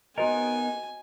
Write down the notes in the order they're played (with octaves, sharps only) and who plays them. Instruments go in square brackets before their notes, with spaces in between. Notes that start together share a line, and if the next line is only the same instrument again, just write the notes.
[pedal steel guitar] B3 D#4 A#4 [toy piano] F#4 C5 D#5 [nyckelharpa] G#5